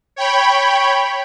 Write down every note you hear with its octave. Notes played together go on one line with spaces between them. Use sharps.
C#5 G5 B5